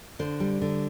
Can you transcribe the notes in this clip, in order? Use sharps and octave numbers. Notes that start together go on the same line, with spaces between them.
D3 C5
G3
D3